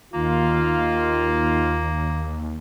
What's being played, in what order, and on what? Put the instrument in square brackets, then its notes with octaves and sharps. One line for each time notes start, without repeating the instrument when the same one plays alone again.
[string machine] D#2 [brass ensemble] D#3 F4 [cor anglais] A#3